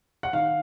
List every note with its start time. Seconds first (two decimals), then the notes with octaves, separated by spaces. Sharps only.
0.23 F#5
0.33 D#3 F5